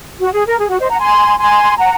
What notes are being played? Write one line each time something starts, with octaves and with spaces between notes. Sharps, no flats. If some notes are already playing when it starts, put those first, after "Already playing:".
F#4
G#4
A#4
G#4
F#4
C5 D#5
F#5 A#5
G#5 C6
G#5 C6
F#5 A#5